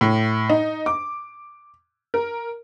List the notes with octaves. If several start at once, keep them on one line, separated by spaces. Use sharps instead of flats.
A2
D#4
D6
A#4